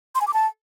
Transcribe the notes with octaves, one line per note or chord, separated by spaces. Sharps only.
C6
G#5
D6
A5